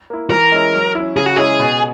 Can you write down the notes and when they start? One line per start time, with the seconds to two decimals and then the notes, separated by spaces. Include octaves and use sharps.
0.10 A#3 E4
0.30 E3 A#4
0.52 G#3 C#4 E4
0.74 F#3
0.95 C#4 E4
1.16 C#3 G#4
1.26 F#4
1.36 G#3 C#4 E4 G#4
1.59 B2